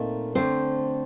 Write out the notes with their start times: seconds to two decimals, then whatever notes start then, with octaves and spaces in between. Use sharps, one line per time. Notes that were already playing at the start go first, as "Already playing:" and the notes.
Already playing: A#2 A3 C4 D#4
0.35 D3 A3 C4 C5